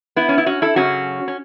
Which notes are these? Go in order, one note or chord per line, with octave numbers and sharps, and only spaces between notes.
B3 E4
C#4
E4
C#4 F#4
E4 A4
F#2 C#3 F#3 C#4 F#4
C#4